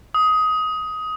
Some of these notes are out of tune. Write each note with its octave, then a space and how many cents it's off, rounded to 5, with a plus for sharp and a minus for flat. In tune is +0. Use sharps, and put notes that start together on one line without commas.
D#6 +15